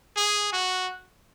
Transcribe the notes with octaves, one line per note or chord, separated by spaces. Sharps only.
G#4
F#4